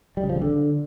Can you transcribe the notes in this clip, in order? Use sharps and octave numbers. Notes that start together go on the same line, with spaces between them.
G3
C#3
F3
C#3
D3